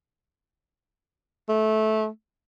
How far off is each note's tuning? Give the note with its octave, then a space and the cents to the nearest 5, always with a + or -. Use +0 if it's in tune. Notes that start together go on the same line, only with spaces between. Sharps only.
A3 -15